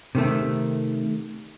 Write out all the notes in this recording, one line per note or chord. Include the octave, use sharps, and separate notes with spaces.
C3 D#3 A3